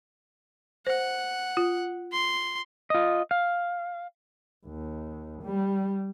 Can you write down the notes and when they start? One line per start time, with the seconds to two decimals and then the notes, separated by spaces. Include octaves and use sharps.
0.87 C5 F#5
1.57 F4
2.12 C6
2.90 F4 D#5
3.31 F5
4.67 D#2
5.43 G3